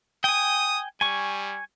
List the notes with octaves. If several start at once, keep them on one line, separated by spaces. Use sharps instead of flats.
G5 G#5 D#6
G3 G#5 C#6